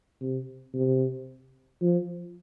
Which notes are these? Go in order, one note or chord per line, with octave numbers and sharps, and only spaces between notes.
C3
C3
F3